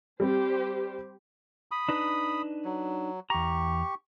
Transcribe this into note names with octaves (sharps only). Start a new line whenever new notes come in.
G3 C4 G4 C5
B5 D#6
D4 D#4 B4
F#3
E2 G4 A#5 C#6